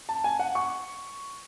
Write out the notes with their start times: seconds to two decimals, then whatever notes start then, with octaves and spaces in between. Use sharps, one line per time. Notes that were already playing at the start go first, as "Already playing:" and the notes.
0.09 A5
0.24 G#5
0.39 F#5
0.55 C#6